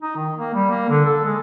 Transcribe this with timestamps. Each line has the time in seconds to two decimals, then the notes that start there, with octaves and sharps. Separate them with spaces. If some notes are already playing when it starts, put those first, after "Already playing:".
0.02 D#4
0.17 D#3
0.38 A#3
0.55 G3
0.70 A#3
0.90 D3
1.06 A4
1.25 G#3